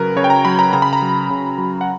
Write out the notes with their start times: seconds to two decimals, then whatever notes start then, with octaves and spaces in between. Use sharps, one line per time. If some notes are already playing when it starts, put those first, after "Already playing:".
Already playing: C#3 F#3 A#4 B4
0.16 C#3 C#5
0.24 G5
0.30 A#5
0.45 F#3 B5
0.59 A#5
0.73 C#3 A#5
0.82 B5
0.93 A#5
1.02 F#3
1.30 C#3
1.58 F#3
1.81 F#5